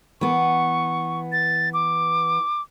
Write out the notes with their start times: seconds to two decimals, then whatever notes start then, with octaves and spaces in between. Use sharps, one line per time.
0.21 E3 B3 C#6
1.32 A6
1.74 D6